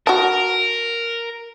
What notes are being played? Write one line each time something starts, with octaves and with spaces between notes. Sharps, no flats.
F#4 A#4 A5